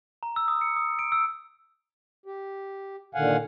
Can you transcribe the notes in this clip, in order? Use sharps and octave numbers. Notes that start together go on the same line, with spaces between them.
A#5
E6
D#6
C#7
D#6
D7
E6
G4
A#2 D3 D#3 F5 F#5 G#5